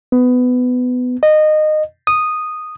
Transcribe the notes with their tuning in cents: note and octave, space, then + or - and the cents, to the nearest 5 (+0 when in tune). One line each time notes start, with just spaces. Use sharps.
B3 +20
D#5 -20
D#6 -10